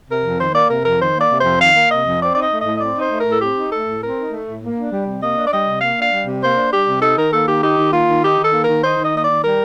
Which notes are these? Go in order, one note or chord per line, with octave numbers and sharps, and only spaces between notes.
C3 A#4
F2
D#3 C5
A#3 D5
C3 A#4
F2 A#4
D#3 C5
A#3 D5
C3
F2 C5
D#3 F5
A#3
C3 D#5
F2
C4 D5
D#4 D5
D#5
A3
D#5
A2
D#5
C4 D5
D#4 C5
A3
A2 A#4
A4
C4 G4
D#4
A3 A4
A2
C4 A#4
D#4
A3
A2
A#3
D4
G3
C3
A#3 D#5
D4
D5
G3 D#5
C3
A#3 F5
D4 F5
G3
C3
A#3 C5
D4
G3 G4
C3
D#4 A4
D#3 A#4
A#3 A4
D#3 G4
D#4 G4
D#3
A#3 F4
D#3
D#4 G4
D#3
A4
A#3
D#3 A#4
D#4 C5
D#3 D#5
A#3 D#5
D5
D#3
G3 A#4